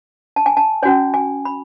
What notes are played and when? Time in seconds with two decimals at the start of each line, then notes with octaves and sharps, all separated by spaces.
0.36 A5
0.46 G#5
0.57 A5
0.83 C#4 F#4 C#5 G#5
1.14 G#5
1.45 B5